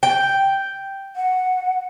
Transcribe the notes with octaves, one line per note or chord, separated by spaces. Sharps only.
G5
F#5